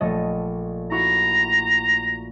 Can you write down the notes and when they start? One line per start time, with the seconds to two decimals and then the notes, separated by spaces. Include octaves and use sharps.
0.01 A#1 A3 D#5
0.91 E4 F#4 A#5 C#6